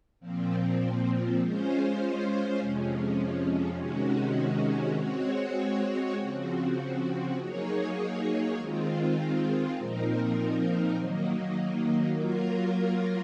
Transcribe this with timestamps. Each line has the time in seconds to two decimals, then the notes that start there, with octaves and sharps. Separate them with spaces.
0.20 A#2 F3 C4
1.39 G#3 C#4 F4 C5
2.59 F2 C3 F3 G#3 C#4
3.78 C3 D#3 G#3 C#4 F#4
4.97 G#3 C4 F#4 C#5
6.18 C#3 F3 C4 F#4
7.36 F#3 A#3 D#4 G#4 C#5
8.56 D#3 G#3 C4 F4
9.76 A#2 F3 C4 D#4 A#4
10.95 D#3 F#3 A#3 D#4
12.15 F#3 A#3 F4 A#4